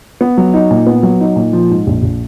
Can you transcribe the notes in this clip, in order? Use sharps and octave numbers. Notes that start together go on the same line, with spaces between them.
B3
F#3
D#4
A#2
B3
F#3
D#4
A#2
F3
G#2
A#1
A#1